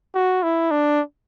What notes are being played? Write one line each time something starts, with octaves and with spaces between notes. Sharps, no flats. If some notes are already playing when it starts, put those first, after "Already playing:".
F#4
E4
D4